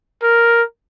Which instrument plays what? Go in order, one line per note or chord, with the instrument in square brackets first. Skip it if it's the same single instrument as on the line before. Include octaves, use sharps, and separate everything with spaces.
[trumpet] A#4